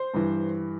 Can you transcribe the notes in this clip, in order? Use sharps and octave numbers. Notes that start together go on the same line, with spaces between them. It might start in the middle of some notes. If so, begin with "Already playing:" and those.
Already playing: C5
G2 E3